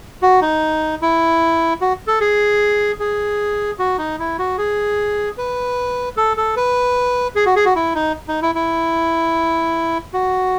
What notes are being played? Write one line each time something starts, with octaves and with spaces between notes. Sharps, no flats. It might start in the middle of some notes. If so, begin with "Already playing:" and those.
F#4
D#4
E4
F#4
A4
G#4
G#4
F#4
D#4
E4
F#4
G#4
B4
A4
A4
B4
G#4
F#4
G#4
F#4
E4
D#4
D#4
E4
E4
F#4